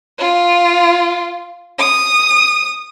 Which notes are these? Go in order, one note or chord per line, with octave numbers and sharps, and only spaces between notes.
F4
D#6